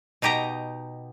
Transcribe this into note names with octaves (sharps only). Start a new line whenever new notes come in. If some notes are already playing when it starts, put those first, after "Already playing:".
B2 D#4 G4 D#5 A#5